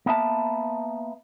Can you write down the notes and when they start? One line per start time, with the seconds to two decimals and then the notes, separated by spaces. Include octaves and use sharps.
0.06 A#3 B3 E5 A5